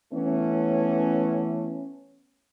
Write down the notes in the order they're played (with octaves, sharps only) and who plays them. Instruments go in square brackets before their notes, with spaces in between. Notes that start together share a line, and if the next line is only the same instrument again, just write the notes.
[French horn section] E3 A3 B3 C#4